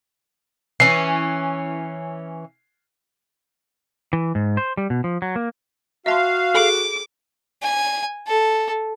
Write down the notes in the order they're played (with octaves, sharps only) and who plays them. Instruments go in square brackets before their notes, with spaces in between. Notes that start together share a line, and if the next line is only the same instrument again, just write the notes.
[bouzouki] E3 C#4 [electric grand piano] C7
[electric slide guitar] E3
G#2
C5
G3
B2
F3
F#3
A#3
[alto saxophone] F#4 [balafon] E5 A5 C6 [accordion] F5
[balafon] G#4 A4 [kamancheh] D6
[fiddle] G#5
A4